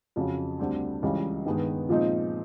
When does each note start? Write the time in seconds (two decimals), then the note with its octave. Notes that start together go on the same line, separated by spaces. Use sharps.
0.16 F2 C#3 F#3
0.59 D2 D3 G3 C4
1.03 C#2 C#3 E3 G3
1.45 G2 D#3 G#3 B3
1.89 A#2 F3 G#3 C4 D#4